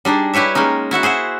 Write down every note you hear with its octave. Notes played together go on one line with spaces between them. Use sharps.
G3 D4 D#4 G#4
E4 G4 B4 C#5 E5
G#3 A#3 C#4 D#4
E4 F#4 E5 F#5
G#4 C5 E5 F#5